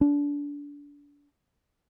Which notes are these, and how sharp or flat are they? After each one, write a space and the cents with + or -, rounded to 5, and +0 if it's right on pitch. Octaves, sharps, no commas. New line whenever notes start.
D4 -30